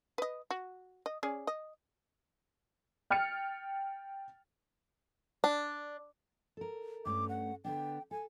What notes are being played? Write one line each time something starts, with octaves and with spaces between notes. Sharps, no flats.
B4 D#5
F#4
D#5
C#4 G#4 D5
D#5
G5 F6 A6 C#7
D4
A4 A#4
G2 A3 C#4 D6
F#5
D3 B3 D4 G5
A4 G#5